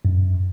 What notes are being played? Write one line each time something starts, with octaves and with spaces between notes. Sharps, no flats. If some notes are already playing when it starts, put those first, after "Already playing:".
F#2